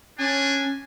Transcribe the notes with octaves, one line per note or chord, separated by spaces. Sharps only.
C#4 D4 G#5